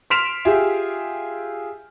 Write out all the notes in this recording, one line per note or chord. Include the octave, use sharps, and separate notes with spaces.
C6 F6 B6 D7 E7 F7
F4 G4 G#4 E5